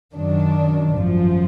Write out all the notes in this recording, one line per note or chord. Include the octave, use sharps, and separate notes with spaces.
F#2 D#3 F#3 D4
G#1 F#2 F3